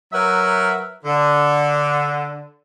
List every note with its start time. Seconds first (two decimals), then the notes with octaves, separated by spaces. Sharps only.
0.13 F#3 A#4 B4 E5
1.05 D3